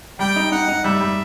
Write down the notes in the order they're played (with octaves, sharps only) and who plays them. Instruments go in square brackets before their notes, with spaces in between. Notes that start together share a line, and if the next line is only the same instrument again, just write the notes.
[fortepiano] G3 [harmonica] G5
[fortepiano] D#4
[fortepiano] D#4 [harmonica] F#5
[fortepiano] D#4
[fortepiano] G3 [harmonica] E5
[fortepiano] G3